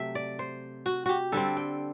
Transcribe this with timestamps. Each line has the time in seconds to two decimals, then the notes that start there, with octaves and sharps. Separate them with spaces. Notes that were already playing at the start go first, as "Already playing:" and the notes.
Already playing: C3 F#3 A3 E5 G5
0.15 D5
0.39 C5
0.86 F#4
1.06 F#4 G4
1.32 D3 G3 C4 A4
1.57 G5